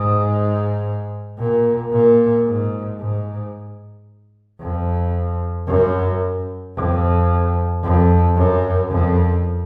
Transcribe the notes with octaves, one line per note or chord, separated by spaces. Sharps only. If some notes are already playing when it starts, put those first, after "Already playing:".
Already playing: G#2
A#2
A#2
G#2
G#2
F2
F#2
F2
F2
F#2
F2